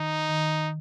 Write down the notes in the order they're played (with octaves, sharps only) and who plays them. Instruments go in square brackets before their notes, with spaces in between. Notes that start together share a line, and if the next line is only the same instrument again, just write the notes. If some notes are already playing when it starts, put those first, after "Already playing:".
Already playing: [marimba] D#3 [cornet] D#4
[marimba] D#3